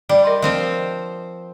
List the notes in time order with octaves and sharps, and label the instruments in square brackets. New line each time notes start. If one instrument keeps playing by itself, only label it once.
[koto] G3 [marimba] D5
[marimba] A#4 D#5 C6
[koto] F3 C4 C5